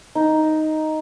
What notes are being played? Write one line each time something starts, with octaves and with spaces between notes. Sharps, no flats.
D#4